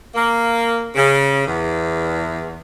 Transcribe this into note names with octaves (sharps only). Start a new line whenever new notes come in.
A#3
C#3
E2